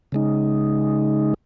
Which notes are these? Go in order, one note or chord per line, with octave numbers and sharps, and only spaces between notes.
C#3 G#3 D#4